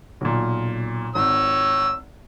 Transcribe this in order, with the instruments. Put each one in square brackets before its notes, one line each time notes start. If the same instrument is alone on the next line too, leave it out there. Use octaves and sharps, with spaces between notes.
[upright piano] B1 A#2
[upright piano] G#1 [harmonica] C#5 E6